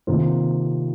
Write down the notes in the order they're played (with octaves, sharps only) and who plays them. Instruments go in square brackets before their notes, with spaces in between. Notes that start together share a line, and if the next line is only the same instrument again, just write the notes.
[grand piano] C3 D#3 A#3 F4 C5